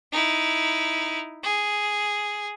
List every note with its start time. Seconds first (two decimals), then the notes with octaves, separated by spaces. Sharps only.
0.12 D#4 E4
1.44 G#4